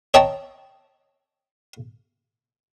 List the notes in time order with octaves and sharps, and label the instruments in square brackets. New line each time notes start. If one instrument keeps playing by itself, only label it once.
[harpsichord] C#5 D#5 G5 A5 A#5